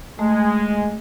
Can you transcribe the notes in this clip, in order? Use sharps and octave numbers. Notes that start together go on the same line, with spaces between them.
G#3 A3